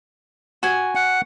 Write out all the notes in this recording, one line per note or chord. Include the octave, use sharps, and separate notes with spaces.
F#4 G#5
F#5